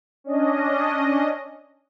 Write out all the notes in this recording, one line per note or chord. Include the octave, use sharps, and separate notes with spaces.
C#4 D4 D#5